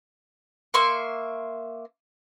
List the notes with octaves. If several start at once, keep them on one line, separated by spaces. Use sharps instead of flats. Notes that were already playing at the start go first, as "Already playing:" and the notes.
A#3 E5 C6 C#6